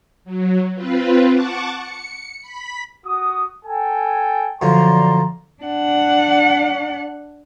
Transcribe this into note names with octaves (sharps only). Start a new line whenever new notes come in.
F#3
C4 F4 B4
F#5 A5 C#6 D6
C#7
B5 B6
F#4 D#6
A4 G5 G#5
F#2 D3 F3 D5 A#5 C6
D4 F#5